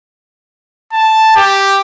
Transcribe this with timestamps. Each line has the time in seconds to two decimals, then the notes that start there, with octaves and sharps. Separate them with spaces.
0.93 A5
1.36 G4